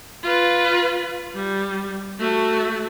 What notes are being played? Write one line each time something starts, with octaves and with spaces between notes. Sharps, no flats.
F4 B4
G3
A3 F#4